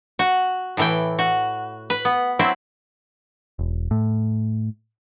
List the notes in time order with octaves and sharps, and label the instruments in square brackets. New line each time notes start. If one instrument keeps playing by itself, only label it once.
[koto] F#4
A2 E3 G5
F#4
B4
B3
F#3 C4 E4
[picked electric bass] E1
A2